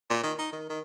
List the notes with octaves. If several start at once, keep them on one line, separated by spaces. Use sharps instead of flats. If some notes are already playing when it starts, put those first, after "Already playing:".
A#2
D#3
D#4
D#3
D#3